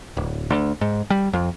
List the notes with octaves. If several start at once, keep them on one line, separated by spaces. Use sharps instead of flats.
D1
D2
G#2
G3
F2